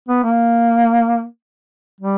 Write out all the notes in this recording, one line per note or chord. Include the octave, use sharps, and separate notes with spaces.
B3
A#3
G3